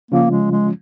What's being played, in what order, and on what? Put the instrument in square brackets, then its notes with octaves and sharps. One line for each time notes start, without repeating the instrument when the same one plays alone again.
[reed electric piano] C#3 F3 C#4 F4 [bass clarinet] A#3
[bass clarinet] G#3
G#3